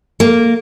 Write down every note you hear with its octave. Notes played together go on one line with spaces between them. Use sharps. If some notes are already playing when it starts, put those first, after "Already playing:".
A#3